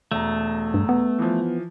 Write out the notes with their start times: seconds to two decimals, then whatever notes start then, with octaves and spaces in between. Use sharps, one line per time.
0.12 E1 A3 A#5
0.74 G2
0.89 B3
1.19 E3 F3